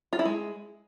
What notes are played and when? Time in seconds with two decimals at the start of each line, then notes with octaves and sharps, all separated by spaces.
0.13 F4
0.19 E4
0.25 G#3